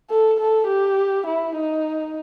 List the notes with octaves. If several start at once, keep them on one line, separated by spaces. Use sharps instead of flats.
A4
A4
G4
E4
D#4